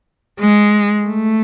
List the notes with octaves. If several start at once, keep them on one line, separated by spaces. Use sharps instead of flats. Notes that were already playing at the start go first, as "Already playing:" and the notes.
G#3
A3